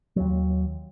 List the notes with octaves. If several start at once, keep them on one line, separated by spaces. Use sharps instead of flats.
D#2 F#3